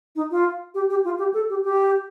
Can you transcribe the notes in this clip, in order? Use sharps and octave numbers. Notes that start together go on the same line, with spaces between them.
D#4
F4
G4
G4
F4
G4
A4
G4
G4